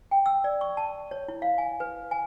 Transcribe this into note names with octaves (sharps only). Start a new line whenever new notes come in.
G5
E6
D5
C#6
A5
C#5
E4
F5
G#5
B4
G#5